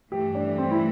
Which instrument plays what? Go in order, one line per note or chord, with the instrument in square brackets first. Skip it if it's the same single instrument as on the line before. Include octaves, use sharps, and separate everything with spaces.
[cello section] G2 E3 A3 [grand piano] G4
[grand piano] D4
C4
E4